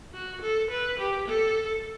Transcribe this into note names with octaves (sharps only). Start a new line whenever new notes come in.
F#4
A4
B4
G4
A4